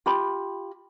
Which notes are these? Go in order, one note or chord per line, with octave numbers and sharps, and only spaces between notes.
F4 G4 B5